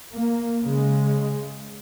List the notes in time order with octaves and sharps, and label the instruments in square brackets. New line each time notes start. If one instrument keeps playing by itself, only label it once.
[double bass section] A#3
C#3 G#3